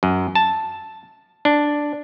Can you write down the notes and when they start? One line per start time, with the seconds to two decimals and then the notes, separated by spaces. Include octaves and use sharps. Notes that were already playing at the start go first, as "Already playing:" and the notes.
0.03 F#2
0.35 A5
1.45 D4